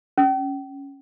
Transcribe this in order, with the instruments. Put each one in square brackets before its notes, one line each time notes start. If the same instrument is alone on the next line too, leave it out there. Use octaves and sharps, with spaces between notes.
[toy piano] C#4